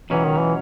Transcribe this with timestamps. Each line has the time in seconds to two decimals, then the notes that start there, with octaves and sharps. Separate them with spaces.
0.10 C#2 B2 E3 F#3 C#4
0.25 D#3
0.40 E3